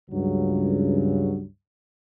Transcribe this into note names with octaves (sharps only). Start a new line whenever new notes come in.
C#2 G2 C#3 F#3